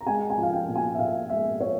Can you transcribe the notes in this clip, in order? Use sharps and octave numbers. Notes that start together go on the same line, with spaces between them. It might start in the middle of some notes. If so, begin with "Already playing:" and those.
A#5
G#3 G#5
G#5
F3
F5
G5
A#2
G#5
E5
A#2 F5
G#3 E5
F3 C#5